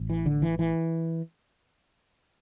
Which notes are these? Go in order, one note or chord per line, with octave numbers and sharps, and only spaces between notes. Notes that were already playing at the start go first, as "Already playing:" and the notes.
Already playing: A1 A2
E3
D3
E3
E3